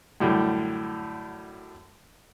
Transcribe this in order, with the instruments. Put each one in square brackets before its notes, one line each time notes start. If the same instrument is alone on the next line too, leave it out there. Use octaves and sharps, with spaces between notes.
[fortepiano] F#2 A2 D3 G3